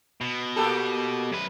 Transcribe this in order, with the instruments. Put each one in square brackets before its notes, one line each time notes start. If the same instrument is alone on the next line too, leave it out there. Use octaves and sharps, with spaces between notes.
[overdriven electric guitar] B2
[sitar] A#3 G4 A4
[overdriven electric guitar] F#2 B4